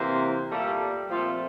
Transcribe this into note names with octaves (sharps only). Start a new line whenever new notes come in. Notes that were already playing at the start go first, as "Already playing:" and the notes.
Already playing: C3 E3 A#3 C4 C5
A#2 G3 A3 A#3 A4
A#2 F3 A3 C4 F4